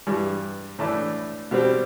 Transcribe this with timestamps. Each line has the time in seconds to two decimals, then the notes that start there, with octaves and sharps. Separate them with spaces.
0.07 G2 E3 G3
0.79 A2 E3 A3 D4 A4
1.51 B2 G3 C4 G4